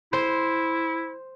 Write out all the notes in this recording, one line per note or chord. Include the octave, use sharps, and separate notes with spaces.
E4 C5